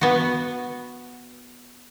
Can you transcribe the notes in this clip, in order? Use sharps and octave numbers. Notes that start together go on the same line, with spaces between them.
B3 F#4